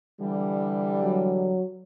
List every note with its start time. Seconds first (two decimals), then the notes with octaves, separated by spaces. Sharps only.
0.20 D3 E3 G3
1.03 F#3